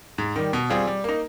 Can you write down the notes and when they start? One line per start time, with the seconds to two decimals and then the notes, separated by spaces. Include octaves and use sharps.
0.18 G#2
0.36 D#3 G3
0.53 B2
0.70 G3 C4 F4 G#4
0.87 G3
1.04 A#3 D#4